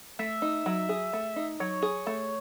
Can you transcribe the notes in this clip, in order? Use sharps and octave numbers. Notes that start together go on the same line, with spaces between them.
A3 E5
D#4
F#3
G#4
A3
D#4
F#3 C#5
G#4
A3